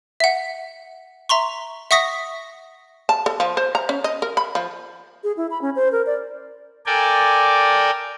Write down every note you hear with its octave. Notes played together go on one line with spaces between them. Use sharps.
E5 F#5
E5 A#5 C6 C#6
E5 F#5 C#6 D#6 A#6 B6
A5
A4
F3
C5
A#5
C#4
D#5
A#4
B5
F3
G#4
E4
B5
C#4
C5
A#4
D5
A4 A#4 D5 G5 G#5